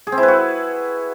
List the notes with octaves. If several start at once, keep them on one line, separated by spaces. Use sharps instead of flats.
G#4
C4
E4
B4
F#4